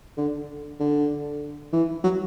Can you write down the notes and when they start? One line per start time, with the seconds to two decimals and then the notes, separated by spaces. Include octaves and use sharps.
0.18 D3
0.80 D3
1.73 E3
2.04 F#3